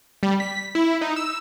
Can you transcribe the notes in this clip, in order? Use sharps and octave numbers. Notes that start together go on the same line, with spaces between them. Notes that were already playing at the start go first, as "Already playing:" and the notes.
G3
B6
E4
D#4
E6